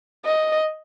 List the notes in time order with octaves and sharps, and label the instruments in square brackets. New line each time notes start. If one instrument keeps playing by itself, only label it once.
[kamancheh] D#5